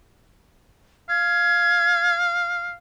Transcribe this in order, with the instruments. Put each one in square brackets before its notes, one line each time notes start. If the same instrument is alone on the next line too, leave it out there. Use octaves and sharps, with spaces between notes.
[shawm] F5 [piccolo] G#6